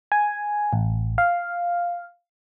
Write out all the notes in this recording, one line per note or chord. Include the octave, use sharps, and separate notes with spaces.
G#5
A1
F5